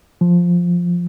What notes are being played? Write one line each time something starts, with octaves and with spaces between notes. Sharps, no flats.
F3